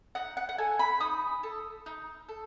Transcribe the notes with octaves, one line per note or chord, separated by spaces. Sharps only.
D#4 F#5
F#5
F#5
A4 G#5
B5
D#4 D#6
A4
D#4
A4